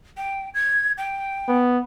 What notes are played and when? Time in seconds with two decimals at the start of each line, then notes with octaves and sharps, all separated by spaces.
0.17 G5
0.54 G#6
0.98 G5
1.48 B3